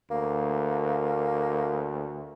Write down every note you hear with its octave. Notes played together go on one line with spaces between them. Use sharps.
D2 A#3